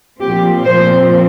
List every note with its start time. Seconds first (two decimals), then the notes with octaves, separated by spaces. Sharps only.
0.20 A#2 F3 C4 G4
0.66 C5